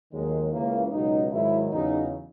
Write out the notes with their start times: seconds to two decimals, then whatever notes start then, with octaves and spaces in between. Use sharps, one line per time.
0.12 D#2 D#3 F#3 G#3
0.52 C#2 C#3 E3 A#3
0.91 C#2 B2 F#3 D#4
1.30 G#2 D#3 F#3 E4
1.71 E2 C#3 F#3 D#4